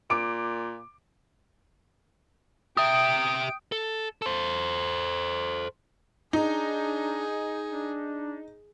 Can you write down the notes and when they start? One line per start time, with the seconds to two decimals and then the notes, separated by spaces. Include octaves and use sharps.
0.10 A#2 D6 D7
2.77 G4 E5 G5 D#6 D7
3.72 A4
4.22 A4 C5
6.33 D4 D#4 G#4
7.71 D4